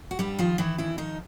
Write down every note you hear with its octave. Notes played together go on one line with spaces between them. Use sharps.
F#4
G2 G3 G4
D#3 F3 F4
D#3 E3 E4
F2 E3 E4
D#3 F3 D#4